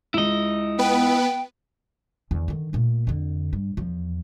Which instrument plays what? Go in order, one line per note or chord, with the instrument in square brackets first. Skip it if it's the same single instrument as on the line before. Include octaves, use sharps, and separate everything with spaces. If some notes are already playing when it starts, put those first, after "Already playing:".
[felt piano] C#2 G#3 [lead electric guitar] E4 D#5
[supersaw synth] B3 B4 [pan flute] G5
[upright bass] E2 D#3
D3 D#3
A#2 A3
F2 D3
G2
E2 F3